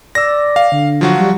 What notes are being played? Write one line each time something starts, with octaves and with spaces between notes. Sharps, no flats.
D5 E6 A#6
F5
D3
F3 F#3 F#4
G3